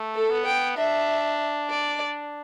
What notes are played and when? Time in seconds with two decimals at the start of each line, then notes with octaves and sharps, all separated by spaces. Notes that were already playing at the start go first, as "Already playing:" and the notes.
Already playing: A3
0.15 A4
0.30 B3
0.46 G5
0.77 D4 E5
1.70 D5